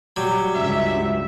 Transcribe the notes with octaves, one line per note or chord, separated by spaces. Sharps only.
F#3 G3
C#2 G2 E5